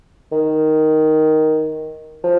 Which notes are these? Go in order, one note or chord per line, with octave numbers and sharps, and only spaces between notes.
D#3
F3